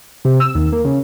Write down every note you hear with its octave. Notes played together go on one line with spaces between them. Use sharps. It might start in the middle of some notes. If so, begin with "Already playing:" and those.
C3
E6
D#2
A#3
C#3